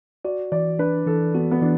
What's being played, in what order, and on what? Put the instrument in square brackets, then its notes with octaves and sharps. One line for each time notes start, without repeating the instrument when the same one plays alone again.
[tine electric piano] F#4 [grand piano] D5
[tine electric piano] E3 [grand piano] D5
[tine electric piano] D4 [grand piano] B4
[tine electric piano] E3 [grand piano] A4
[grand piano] B3 [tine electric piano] F#4
[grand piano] B3
[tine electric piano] E3 [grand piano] D4